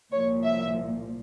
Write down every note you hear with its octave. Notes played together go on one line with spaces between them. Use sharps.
C2 A#2 F3 C#5
E5